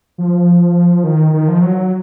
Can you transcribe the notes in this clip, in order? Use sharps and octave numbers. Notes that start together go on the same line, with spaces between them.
F3
D#3
D#3
F3
F#3